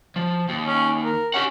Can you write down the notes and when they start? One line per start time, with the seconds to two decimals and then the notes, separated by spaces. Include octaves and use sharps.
0.16 F3
0.49 D#2
0.67 C#4
1.04 A#4
1.34 C#4 G4 F#5